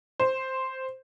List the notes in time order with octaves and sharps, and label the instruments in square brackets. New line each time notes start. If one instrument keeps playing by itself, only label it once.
[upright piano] C5